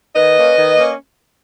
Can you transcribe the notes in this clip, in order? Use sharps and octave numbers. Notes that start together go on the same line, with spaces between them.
D#3 B4 D#5
A#3 C#4
D#3
A#3 C#4